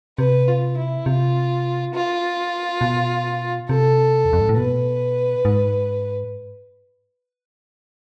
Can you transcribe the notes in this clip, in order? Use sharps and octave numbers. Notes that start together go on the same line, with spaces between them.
C3 B4
F4
E4
C3 F4
F4
B2
C3 A4
E2
F2
G#2
A2
B2 B4
G#2